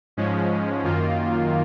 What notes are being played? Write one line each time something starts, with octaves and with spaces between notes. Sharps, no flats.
G#2 F3 G#3 C#4
F#2 D#3 A#3 F4